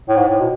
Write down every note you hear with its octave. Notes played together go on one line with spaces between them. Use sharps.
A2
G#2
A2
B2